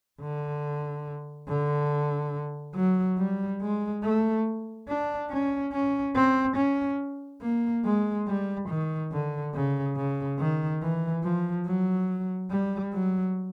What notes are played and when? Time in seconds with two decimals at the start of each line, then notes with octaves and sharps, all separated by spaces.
0.21 D3
1.49 D3
2.75 F#3
3.18 G3
3.61 G#3
4.04 A3
4.88 D4
5.30 C#4
5.73 C#4
6.16 C4
6.57 C#4
7.42 A#3
7.85 G#3
8.27 G3
8.69 D#3
9.12 D3
9.54 C#3
9.96 C#3
10.39 D#3
10.82 E3
11.24 F3
11.66 F#3
12.51 G3
12.93 F#3